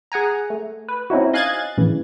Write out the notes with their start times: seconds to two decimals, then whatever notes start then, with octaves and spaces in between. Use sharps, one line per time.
0.12 G#4 F#5 G#5 A#5
0.50 A3
0.89 B4
1.10 C4 C#4 D#4 E4 F#4
1.33 D#5 F5 G#5 F#6 G#6 A6
1.77 A2 C#3 E3